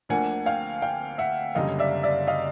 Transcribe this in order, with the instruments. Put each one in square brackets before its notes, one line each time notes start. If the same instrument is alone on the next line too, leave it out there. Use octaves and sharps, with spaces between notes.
[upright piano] D2 D3 F3 A#3 D4 [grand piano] F#5 G#5
[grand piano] F5 G5
F5 G5
E5 F#5
[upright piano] F#1 F#2 D3 G3 [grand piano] D#5 F5
[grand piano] D5 E5
D5 E5
D#5 F5